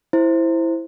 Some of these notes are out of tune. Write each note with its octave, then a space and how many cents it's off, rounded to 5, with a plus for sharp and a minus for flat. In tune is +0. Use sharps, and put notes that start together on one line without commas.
E4 +0 C5 +0